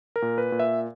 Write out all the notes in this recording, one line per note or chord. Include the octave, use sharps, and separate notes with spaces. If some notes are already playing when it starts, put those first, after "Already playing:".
A#4
A#2
B4
A#2
E5